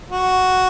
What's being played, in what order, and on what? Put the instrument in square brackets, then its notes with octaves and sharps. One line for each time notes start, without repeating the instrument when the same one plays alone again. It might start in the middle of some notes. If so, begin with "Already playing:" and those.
[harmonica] F#4